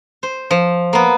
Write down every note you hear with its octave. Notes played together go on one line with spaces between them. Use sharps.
C5
F3
A#3 B3